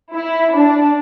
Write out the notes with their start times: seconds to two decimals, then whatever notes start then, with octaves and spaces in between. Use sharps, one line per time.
0.14 E4
0.54 D4